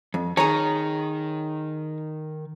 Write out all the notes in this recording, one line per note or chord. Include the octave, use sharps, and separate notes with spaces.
F2
D#3 G#4 C#5 A#5